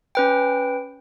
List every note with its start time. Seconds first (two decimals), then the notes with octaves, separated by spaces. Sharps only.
0.15 C#4 B4 G5